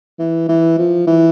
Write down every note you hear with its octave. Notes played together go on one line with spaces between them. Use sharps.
E3
E3
F3
E3